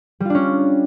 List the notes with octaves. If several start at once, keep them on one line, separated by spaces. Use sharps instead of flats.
G3 C#4 D4 F4